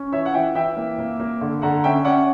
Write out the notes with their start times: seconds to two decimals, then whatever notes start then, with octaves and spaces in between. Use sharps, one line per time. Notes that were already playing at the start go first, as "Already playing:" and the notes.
Already playing: C#4
0.12 E3 C#5 E5
0.26 F#5
0.34 E3 E5 G5
0.55 E3 E5 G5
0.76 A#3
0.98 A#3
1.19 A#3
1.41 D3
1.62 D3 F#5 A#5
1.84 C#4 E5 G5
2.05 C#4 D5 F#5